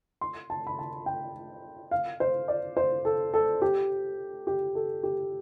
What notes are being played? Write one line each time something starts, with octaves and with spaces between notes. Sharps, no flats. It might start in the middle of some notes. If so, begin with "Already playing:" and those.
C6
A5
B5
A5
G5
F5
C5
D5
C5
A4
A4
G4
G4
A4
G4